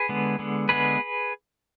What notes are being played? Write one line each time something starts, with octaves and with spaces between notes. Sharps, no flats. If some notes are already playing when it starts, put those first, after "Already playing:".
Already playing: G#4 B4
D3 G#3 B3
D3 G#3 B3
D3 G#3 B3 G#4 B4